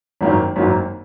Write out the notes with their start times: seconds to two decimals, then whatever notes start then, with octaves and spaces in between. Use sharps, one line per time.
0.21 G#1 F#2 D#3 F#3 A#3
0.56 G#1 F#2 D#3 F#3 A#3